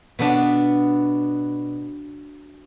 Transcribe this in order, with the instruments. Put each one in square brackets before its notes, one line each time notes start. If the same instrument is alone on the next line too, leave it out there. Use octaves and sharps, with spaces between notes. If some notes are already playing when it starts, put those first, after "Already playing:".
[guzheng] B2 B3 D4